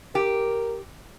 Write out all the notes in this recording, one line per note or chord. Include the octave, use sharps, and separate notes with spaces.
G4 A#4